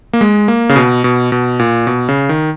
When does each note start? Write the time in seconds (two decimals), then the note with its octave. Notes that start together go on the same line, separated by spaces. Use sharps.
0.13 A#3
0.21 G#3
0.48 A#3
0.69 C#3
0.76 B2
1.04 B2
1.32 B2
1.59 A#2
1.87 B2
2.09 C#3
2.29 D#3